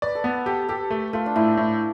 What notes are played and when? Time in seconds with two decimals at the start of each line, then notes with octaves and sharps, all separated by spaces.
0.02 B4 D5
0.15 A4
0.24 B3 B4
0.46 G4 A4
0.69 G4 A4
0.90 A3
1.13 A3 F4
1.26 D4
1.36 A2 E4
1.57 A2